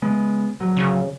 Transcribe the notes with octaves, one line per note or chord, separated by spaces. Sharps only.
C#3 G#3 B3
D1 A#1 F#3
C#3